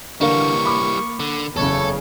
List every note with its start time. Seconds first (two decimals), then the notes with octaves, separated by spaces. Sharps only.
0.21 D3 E3 G3 A#3 A#4 F5 C#6
0.65 B5 D6
1.20 D3
1.57 F#1 E2 C#3 A4 C#5